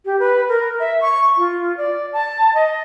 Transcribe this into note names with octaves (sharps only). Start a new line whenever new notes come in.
G4
B4
A#4
E5
C#6
F4
D5
A5
D#5